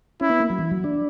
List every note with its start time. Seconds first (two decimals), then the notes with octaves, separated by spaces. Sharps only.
0.21 C#4 E4
0.30 B3
0.40 A#3
0.50 F#3
0.59 E3
0.71 F#3
0.84 D4